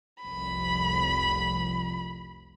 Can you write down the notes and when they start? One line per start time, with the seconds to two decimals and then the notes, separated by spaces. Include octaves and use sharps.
0.23 F1 C2 F2 B5